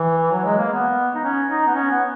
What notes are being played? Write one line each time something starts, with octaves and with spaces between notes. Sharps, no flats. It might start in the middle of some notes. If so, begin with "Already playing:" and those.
Already playing: E3
F#3
G#3
A#3
B3
D#4
C#4
D#4
B3
C#4
B3